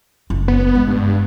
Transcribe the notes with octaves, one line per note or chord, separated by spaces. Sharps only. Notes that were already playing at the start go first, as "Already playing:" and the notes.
F#1 F4
B3
G#3
G2